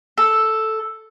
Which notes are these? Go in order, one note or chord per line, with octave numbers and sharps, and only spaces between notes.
A4